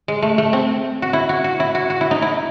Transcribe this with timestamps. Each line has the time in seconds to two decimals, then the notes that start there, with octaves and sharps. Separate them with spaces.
0.08 G#3
0.22 A3
0.38 A3
0.53 C4
1.02 F#4
1.13 E4
1.29 F#4
1.44 F#4
1.60 E4
1.75 F#4
1.90 F#4
2.01 E4
2.11 D#4
2.22 E4